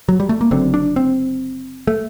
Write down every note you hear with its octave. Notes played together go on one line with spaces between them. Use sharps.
F#3
G3
A3
A#3
F#1 F#2 D3 C4
D4
C4
A3